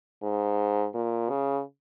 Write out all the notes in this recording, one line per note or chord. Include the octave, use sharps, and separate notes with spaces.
G#2
A#2
C#3